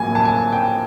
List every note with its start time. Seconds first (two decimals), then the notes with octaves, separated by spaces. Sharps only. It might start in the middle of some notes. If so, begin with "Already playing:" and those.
Already playing: A#1 A2 F#3 A#3 G#5
0.15 A5
0.25 G#5
0.52 G5